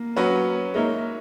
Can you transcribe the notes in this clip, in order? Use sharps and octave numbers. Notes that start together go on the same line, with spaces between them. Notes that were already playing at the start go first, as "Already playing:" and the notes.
Already playing: A#3
F#3 C#4 F#4 B4
G#3 A#3 D#4 A#4 C#5 E5